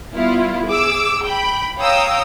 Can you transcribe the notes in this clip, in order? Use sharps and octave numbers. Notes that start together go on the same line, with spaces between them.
G3 B3 E4 F4
G#4 D6 E6
G5 B5
C#5 F5 G5 A#5 D#6 E6